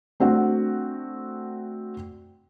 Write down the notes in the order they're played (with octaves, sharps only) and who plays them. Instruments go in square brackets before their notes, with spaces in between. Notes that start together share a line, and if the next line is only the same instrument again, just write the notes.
[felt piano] A3 C4 D4 F#4 F#5